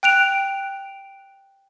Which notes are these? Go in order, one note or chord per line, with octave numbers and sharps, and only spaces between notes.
G5 F#6 D7 F7